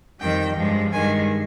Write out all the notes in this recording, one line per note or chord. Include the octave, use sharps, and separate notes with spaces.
F2 D#3 G3 G5
G2 F3 G#3
G2 D#3 G#3 G#5